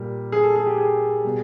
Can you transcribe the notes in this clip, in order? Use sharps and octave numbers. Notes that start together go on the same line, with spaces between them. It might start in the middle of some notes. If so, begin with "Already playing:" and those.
Already playing: A#2 G3
G#4
A4
G#4
G4
G#4
B2 G3